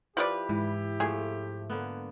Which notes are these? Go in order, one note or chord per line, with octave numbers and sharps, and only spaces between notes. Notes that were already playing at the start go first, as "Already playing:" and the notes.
F3 E4 G4 B4 D5
G#2 E3
F3 A3 G#4
D3 A#3 B3